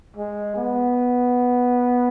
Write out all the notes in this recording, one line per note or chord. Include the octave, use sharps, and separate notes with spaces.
G#3
B3